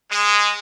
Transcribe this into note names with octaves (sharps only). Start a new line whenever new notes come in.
G#3